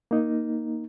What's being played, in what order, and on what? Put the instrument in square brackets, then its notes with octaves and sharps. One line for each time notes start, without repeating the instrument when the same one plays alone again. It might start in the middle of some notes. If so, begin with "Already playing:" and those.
[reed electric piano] A#3 D#4